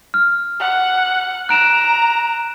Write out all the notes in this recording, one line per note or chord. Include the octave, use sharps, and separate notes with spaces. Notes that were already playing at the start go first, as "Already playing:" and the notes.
F6
F#5
A#5 F#6 D7 E7